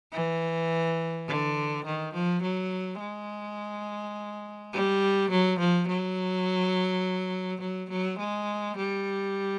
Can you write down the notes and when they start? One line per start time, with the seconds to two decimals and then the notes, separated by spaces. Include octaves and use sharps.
0.12 E3
1.28 D3
1.85 D#3
2.14 F3
2.43 F#3
3.00 G#3
4.73 G3
5.31 F#3
5.59 F3
5.88 F#3
7.61 F#3
7.90 F#3
8.19 G#3
8.77 G3